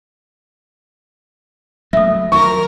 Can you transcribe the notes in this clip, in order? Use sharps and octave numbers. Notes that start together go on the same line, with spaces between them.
F#3 A3 E5 D#6
D#3 F3 F#3 A#4 C#6